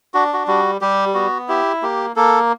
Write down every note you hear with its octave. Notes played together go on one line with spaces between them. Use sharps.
D4 F#4
F#4
G3 F#4
G3 G4
B3 F#4
E4 G4
A#3 G4
A#3 A4